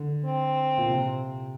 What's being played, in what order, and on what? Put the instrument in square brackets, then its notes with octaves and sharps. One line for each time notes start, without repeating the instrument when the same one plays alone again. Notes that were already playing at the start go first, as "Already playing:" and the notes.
Already playing: [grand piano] D3
[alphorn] C4
[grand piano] A#2
C3